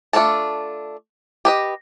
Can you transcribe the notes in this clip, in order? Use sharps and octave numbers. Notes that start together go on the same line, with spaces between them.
A3 D4 F4 A4 A5
G4 B4 D#5